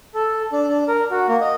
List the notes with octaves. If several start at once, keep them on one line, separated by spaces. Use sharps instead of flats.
A4
D4
D4
A#4
F#4
A#3
D#5